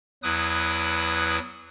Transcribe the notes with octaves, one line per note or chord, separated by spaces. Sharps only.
E2 F#3 E4 B4 D#6